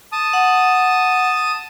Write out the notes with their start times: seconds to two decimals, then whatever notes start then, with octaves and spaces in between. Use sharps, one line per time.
0.12 A5 D#6
0.33 F#5